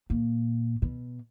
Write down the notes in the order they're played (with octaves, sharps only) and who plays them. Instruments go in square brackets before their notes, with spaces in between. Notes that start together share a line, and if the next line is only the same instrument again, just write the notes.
[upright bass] A#2
B2